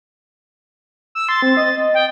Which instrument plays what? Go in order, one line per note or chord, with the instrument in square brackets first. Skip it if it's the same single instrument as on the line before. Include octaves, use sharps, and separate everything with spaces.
[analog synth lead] E6
[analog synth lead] C6 [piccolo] A6
[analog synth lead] C4
D#5
[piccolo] G5